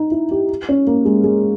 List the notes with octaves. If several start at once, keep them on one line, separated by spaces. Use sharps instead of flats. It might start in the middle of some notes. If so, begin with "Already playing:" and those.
Already playing: D#4
E4
G4
C#4
A#3
G#3
G#3